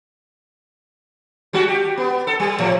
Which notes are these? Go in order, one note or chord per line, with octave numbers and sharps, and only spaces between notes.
G3 G#3 F#4
G4
B3
A4
G3
A2 F3